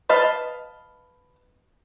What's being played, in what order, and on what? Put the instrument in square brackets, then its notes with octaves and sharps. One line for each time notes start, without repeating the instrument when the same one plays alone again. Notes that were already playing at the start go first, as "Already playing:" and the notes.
[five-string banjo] B4 D#5 F5 A5